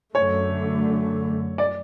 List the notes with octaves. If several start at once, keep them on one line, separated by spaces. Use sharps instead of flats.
F#2 D3 A3 C#5
D5